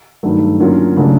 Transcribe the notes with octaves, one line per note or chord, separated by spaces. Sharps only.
G2 D#3 F#3 A3
D3 F#3 A#3 C#4 F4
C#3 F#3 A3 D4